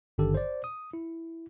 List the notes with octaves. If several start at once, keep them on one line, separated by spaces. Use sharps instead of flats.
G#1 G2 D3 D#3 G4 A4
C5 D5
D#6
E4